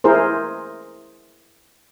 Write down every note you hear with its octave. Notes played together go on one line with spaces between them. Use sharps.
E4 G#4 A#4 C5